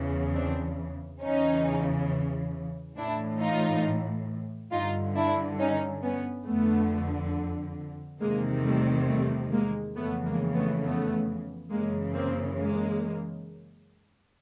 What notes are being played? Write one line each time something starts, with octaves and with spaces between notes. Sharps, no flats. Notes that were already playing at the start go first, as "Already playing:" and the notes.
Already playing: E2 C#3 E3
C4 D4
E2 C#3 E3 C#4 D#4
A2 E3 D4 E4
D#4 F4
G2 D3 D#4 F4
D4 E4
C#4 D#4
B3 C#4
F2 D3 A3 B3
E2 C3 D#3 G#3 A#3
G3 A3
G3 A3
G#3 A#3
F2 C#3 E3 A3 B3
G#3 A#3
A3 B3
A3 B3
F#2 C#3 E3 G#3 A#3
A#3 C4
G#3 A#3